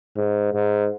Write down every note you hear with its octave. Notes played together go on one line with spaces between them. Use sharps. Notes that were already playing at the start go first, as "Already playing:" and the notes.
G#2
G#2